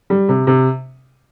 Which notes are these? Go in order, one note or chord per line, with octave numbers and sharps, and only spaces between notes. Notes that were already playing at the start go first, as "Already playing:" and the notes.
G3
C3
C3